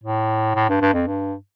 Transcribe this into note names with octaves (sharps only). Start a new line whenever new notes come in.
A2
A2
G2
G2
F2
G2